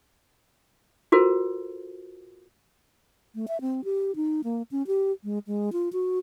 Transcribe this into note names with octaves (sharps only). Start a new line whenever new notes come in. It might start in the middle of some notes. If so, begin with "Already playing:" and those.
F4 F#4 A4 A#4 C5
A3
E5
C4
G4
D#4
A#3
C#4
G4
G#3
G#3
F4
F#4